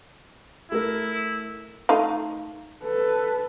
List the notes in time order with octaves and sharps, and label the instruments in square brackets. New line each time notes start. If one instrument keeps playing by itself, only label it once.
[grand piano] A3 A#4 [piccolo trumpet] E4
[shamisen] A3 D#4 F4
[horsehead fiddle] A4 B4